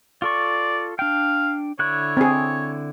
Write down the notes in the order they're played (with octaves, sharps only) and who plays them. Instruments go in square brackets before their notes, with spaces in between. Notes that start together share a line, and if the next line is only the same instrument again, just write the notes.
[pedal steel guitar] F4 A4 C#6 [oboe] D5
[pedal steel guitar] D4 G5 [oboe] F5
[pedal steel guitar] D3 E4 F#6 [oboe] C#5
[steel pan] C4 G#4